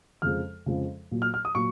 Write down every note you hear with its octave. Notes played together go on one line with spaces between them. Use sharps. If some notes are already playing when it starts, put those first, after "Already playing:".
F2 C#3 F3 G#3 F6
F2 C#3 F3 G#3
A#2 F#3 A#3
F6
F6
D#6
A#2 F#3 A#3 C#6